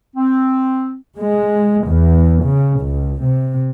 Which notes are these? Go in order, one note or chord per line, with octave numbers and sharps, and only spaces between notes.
C4
G#3
E2
C#3
C#2
C3